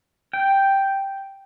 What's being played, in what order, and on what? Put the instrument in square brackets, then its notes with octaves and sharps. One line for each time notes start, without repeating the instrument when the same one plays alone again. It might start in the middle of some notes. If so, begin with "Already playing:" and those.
[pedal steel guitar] G5